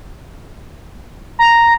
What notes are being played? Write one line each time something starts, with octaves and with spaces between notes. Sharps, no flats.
A#5